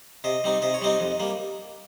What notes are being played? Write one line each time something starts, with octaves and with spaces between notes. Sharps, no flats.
C3 D#5
G3 C4 D#4
C3 D#5
C#5
G3 C4 D#4 D#5
F2
G3 A#3